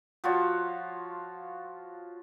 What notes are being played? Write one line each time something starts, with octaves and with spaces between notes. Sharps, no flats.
F3 F4 F#4 C#5